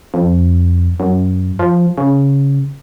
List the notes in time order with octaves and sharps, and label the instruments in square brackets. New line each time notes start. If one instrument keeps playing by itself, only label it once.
[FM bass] F2
F#2
F3
C#3